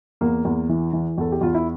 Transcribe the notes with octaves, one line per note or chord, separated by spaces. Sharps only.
E2 A#3
E2
E3
E3
E2 A4
G4
E2 F4
E4